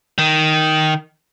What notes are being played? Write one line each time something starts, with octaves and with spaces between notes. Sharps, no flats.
D#3